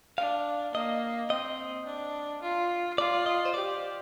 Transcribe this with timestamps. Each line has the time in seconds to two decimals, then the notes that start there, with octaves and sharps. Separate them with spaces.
0.18 D4 F5
0.74 A#3 D#5
1.30 C4 D#5
1.86 D4
2.42 F4
2.98 F4 D5
3.26 D#5
3.45 C5
3.54 G4 D5